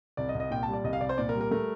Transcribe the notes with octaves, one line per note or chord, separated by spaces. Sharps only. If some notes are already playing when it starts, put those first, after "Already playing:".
C2 D5
D#5
C2
D#5
A#2 G5
A5
G3
D5
C2 D#5
F5
C2 D5
C5
A#2 D5
A#4
G3
A#4
A3 A#4